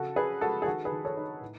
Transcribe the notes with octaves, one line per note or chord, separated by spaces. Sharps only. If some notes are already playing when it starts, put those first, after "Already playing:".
Already playing: C#3 F#4 A4
C#4 G#4 B4
G#3 F#4 A4
G#4
D#3 F#4 A4
G#4 B4
D#3
A4 C#5
D#4
A2